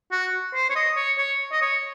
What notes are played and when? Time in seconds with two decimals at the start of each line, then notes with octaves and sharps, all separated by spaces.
0.12 F#4
0.55 C5
0.70 C#5
0.76 D#5
0.96 C#5
1.18 C#5
1.52 D#5
1.62 C#5